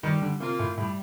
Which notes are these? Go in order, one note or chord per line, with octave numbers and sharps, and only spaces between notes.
D#3 G3
D3
C3 A#3 F4
A2
A2 G3